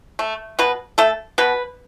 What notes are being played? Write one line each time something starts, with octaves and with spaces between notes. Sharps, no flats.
A3
B2 B4
A3 A4
B2 B4